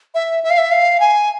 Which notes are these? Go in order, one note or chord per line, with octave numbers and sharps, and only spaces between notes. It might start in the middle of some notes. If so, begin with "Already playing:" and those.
E5
E5
F5
E5
F5
G#5